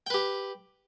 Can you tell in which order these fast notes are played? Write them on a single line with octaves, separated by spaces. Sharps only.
G5 B4 G4